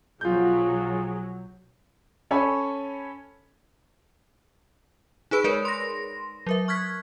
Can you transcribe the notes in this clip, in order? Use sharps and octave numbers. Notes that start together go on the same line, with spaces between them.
B1 F3 F#3 F4 G#4 G6
C#4 A4 C#5 G#5 B5
D#4 G#4 B4 B5 E6 D7
G#3 A#4 B4 C#5 D5
C6 A#6
F#3 A#4 E5
C#6 F6 F#6 G#6 B6